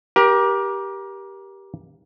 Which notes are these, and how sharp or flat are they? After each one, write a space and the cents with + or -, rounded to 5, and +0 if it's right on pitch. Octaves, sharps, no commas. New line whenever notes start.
G4 +0 A#4 +30